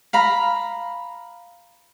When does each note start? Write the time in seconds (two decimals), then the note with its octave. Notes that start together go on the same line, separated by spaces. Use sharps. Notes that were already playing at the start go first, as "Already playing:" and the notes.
0.13 F5 A#5 B5